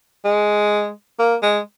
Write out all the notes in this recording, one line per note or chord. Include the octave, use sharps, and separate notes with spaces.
G#3
A#3
G#3